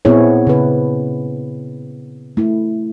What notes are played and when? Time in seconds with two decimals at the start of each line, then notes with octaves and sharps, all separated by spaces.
0.05 A#2 B3 C4 E4 G#4 C#5
0.47 C#3 B4
2.37 A3 E4